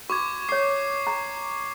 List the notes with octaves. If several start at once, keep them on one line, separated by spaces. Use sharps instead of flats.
F#4 C#6 D6 G#6
C#5 D6 C7
A#5